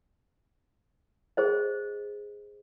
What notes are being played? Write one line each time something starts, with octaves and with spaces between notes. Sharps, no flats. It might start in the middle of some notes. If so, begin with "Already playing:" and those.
G#4 C5 D#5